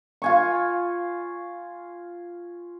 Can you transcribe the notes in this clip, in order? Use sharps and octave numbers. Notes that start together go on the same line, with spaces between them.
F4 G#5 C#6